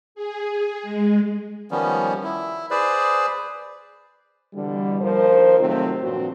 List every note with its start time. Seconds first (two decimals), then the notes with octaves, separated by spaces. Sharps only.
0.15 G#4
0.83 G#3
1.71 D#3 F3 G3 B3 C#4
2.24 E4
2.71 G#4 B4 C5 D5
4.54 B2 D3 E3 G3
5.01 D#2 F3 A#4 C5
5.60 C3 D#3 F#3 A3 C4 F4
6.03 G2 A#2 F3 C4 F#4